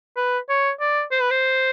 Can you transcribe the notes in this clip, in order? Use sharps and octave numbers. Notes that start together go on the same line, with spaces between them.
B4
C#5
D5
C5
B4
C5